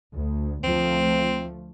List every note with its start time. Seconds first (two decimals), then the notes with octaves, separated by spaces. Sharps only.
0.13 D2
0.64 D2 F3 A3 C4